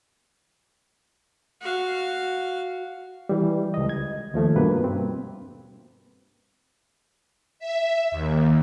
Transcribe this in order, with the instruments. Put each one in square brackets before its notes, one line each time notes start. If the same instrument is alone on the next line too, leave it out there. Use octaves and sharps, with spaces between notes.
[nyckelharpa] F#4 F5
[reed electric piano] E3 G3
C#2 D#5
G#6
D#2 F3 A3
G2 B2 A#3 B4
C4
[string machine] E5
D#2